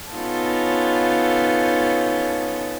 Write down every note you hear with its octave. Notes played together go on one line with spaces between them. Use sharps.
B3 C#4 D#4 F4 A4